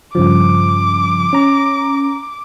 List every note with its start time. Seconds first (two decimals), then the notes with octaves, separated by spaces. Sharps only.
0.15 G2 C#3 F3 D6
1.33 C#4 A#5